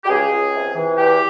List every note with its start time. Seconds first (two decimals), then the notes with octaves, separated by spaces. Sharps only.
0.04 G4
0.09 C#2 G#4
0.31 C#2
0.54 C3
0.75 E3
0.97 E2 G4